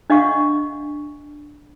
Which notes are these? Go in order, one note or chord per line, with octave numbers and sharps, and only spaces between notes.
D4 D#5 F5 F#5 C#6